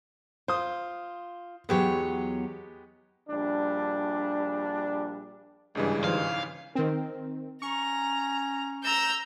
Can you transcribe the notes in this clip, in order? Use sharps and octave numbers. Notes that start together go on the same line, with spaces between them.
F4 C5 D#6
E2 F#3 G#3 B3 G4 C#5
A#1 G3 D4
G#1 G2 C#3 E3 G#3
D#3 F3 C5 F5
D#3 C4 A#4
C#4 A#5 C#6
A#5 E6 G6